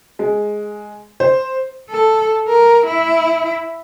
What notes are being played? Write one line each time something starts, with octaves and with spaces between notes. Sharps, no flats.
G#3
C5
A4
A#4
E4